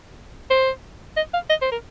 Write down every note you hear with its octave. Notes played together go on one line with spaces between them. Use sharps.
C5
D#5
F5
D#5
C5
A#4